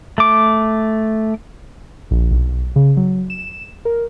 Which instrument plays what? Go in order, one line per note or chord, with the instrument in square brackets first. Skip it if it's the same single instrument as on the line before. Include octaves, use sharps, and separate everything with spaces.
[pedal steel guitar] A3 D6
[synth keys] A#1
B1
C#3
F#3
E7
A#4